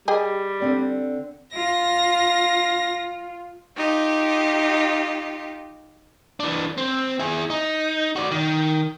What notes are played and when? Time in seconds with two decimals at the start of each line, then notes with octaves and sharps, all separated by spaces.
0.08 G3 G4 G#4 D#5
0.60 D3 C4 D5
1.54 F4 A#6
3.77 D#4 F4 G4
6.40 E3 D4
6.78 C4
7.19 E4 G#4
7.50 D#4
8.16 F#4 D5
8.31 D#3